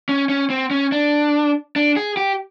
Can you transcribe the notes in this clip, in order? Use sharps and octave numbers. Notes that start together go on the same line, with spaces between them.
C#4
C#4
C4
C#4
D4
D4
G#4
G4